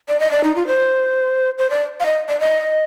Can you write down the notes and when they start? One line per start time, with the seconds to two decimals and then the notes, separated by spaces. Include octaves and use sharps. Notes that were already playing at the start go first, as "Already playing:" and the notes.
0.08 D5
0.20 D#5
0.31 D5
0.44 D#4
0.56 F4
0.67 C5
1.58 C5
1.70 D5
2.00 F5
2.06 D#5
2.29 D5
2.40 D#5